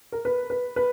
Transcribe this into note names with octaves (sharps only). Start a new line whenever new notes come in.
A#4
B4
B4
B4